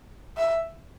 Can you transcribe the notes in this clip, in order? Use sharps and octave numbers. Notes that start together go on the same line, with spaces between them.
E5